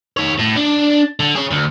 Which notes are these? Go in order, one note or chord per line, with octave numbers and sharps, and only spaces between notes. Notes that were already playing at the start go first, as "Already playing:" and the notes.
D#3 C#5
A2
D4
D3
G#4 C#5
D2